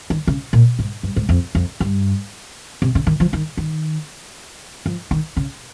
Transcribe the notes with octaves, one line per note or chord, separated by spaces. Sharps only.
D#3
C#3
A#2
G#2
G2
G#2
F2
F2
G2
C3
C#3
D#3
F3
D#3
D#3
F3
D#3
C#3